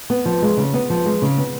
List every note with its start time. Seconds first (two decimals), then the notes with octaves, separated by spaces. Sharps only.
0.10 B3
0.26 F3
0.42 G#3
0.57 C#3
0.74 B3
0.90 F3
1.06 G#3
1.22 C#3
1.38 B3